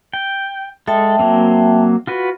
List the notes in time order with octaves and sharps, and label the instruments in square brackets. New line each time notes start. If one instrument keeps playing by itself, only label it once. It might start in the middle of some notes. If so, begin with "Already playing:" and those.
[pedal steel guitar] G5
[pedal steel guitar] G#3 A4 [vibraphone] E5 G5 A5
[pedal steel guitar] F#3 A#3 C4
F4 F#4 B4